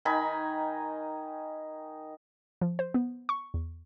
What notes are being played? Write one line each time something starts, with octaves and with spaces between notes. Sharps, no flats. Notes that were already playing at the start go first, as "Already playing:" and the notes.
D#3 D#4 G#5 B5
F3
C5
B3
C#6
E2